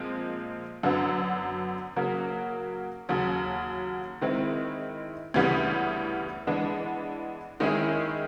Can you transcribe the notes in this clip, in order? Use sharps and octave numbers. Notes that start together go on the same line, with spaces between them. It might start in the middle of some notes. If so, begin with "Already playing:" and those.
Already playing: A#2 F3 G#3 C4
F#2 D3 F#3 B3
C#3 F#3 A#3
D#2 C#3 F#3
D#3 G#3 C4 E4
D2 C#3 E3 G3 B3
E3 G#3 B3 D4
D#3 G#3 C#4 E4 G#4